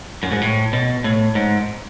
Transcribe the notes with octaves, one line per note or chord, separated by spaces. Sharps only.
F#2
G#2
A2
B2
A2
G#2